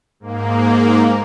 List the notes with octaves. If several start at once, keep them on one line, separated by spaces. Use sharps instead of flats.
G#2 A#3